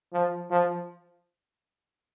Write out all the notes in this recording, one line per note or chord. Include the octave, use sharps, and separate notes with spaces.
F3
F3